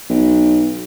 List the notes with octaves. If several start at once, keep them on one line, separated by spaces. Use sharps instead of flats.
B1